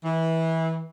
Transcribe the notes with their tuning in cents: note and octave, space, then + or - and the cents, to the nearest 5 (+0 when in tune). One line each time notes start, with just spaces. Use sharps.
E3 -20